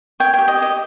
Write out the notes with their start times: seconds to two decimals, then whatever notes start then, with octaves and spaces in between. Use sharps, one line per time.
0.20 C#5 G5
0.34 G5
0.39 G4
0.48 D#5
0.58 G4 D#5